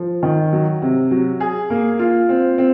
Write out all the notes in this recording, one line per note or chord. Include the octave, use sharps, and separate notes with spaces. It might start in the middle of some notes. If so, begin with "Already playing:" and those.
Already playing: F3
D#3
F#3
C3
F#3
G#4
A#3
F4
C4
C4